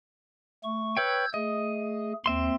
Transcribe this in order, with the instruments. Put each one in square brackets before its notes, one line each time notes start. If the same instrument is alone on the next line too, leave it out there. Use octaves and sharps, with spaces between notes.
[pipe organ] A3 C#6
[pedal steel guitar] B4 C#5 G5 [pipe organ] E6 G6 G#6
[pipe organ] A3 G#4 [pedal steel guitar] D#5
[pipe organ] D#2 [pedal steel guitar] C4 E5 C6